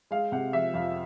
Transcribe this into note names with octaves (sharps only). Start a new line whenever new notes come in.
G#3 F5
C3 F#5
F3 E5
F2 F5